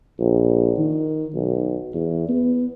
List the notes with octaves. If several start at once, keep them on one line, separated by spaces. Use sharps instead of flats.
A#1
D#3
B1
E2
B3